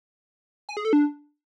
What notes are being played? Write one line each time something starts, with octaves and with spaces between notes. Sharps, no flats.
G#5
G#4
A4
D4